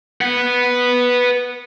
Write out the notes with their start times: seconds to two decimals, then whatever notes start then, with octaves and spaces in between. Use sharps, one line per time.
0.21 B4 F#5